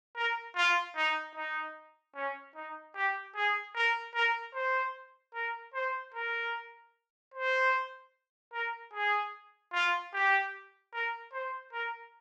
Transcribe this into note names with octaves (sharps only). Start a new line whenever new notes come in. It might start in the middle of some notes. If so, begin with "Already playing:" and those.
A#4
F4
D#4
D#4
C#4
D#4
G4
G#4
A#4
A#4
C5
A#4
C5
A#4
C5
A#4
G#4
F4
G4
A#4
C5
A#4